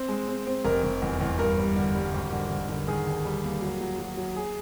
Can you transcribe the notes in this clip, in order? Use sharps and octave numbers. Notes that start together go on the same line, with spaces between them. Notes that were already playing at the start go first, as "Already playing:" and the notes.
Already playing: C4
G#3
C4
C4
F1 A#4
F1
E2
E2
G2 A#4
G3
D3
G3
G#1
D3
G#1
D3
D#3 G#4
D#2
G3
A#3
F#3
F#3
F#3
F#3
G#4